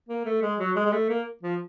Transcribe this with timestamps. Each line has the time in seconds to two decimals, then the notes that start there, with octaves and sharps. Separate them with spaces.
0.09 A#3
0.26 A3
0.42 G#3
0.59 F#3
0.76 G#3
0.86 G#3
0.93 A3
1.10 A#3
1.43 F3